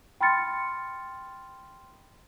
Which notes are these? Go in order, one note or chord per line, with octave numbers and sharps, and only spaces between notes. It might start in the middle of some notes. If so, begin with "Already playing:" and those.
G5 B5 C6 F6 A6 C#7